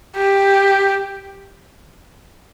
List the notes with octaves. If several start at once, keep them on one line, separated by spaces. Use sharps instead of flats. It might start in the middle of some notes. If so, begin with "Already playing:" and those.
G4